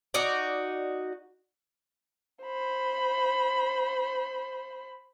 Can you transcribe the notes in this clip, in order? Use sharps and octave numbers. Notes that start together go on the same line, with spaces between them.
D#4 F#4 D5
C5 B5